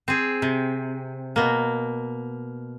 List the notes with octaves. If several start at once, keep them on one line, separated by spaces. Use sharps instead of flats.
C4 G#4
C3
B2 A#3